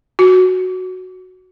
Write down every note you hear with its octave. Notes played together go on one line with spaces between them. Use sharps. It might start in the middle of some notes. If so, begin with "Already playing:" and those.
F#4